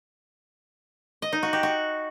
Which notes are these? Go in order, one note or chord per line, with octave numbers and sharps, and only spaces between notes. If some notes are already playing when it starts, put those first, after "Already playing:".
D#5
D#4
F#4
G4
F#4